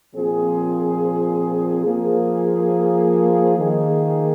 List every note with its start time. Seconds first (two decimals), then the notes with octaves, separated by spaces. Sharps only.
0.12 A#2 F3 C4 G#4
1.85 F3 A#3 G#4
3.58 D#3 A#3 G#4